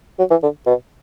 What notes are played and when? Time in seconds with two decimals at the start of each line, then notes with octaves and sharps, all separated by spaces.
0.19 F#3
0.30 E3
0.43 D3
0.66 B2